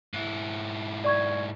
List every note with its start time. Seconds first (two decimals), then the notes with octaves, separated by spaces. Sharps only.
0.14 G#2 E4
1.04 D5 C#6 G#6